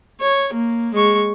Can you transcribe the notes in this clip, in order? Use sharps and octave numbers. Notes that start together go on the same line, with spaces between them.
C#5
A#3
G#3 C#6